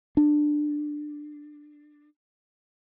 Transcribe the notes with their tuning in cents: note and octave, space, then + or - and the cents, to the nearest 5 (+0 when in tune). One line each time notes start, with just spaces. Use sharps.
D4 +15